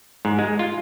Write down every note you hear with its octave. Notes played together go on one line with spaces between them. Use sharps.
G#2
G#3
F4